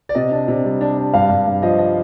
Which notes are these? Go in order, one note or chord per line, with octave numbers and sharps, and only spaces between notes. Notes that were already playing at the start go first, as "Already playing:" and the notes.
D5
C3 D#5
D4
C3
G3
D4
D4
G2 F5
G2
G2
F3 D#5
D#5